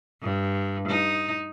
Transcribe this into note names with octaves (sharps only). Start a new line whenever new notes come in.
G2
D#4